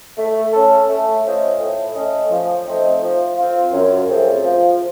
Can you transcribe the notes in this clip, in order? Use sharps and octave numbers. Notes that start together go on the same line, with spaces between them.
A3
C#4 A4
A3
C#4 F4 C5 D#5
A2
A3 C#4 A4 D#5
F3
A3 C4 D#4
F3
C4 F4
F#2
C#3 F3 A3 C4
F3